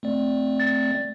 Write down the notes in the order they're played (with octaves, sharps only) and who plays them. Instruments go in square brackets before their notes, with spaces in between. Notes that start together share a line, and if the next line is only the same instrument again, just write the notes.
[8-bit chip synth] A3 C4 D5
[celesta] A6